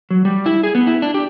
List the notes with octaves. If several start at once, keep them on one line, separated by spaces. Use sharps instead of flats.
F#3
G3
E4
G#4
B3
E4
D4
G4